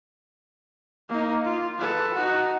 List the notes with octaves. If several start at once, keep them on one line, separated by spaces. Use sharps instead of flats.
A#3 D#4
F4
A4 B4
D#4 F#4